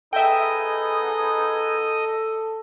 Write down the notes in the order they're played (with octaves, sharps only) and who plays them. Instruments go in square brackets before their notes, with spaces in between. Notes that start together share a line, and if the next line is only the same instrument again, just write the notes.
[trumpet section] B3 D#4 G#4 [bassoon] A4 [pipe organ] D#5 [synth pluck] E5 G5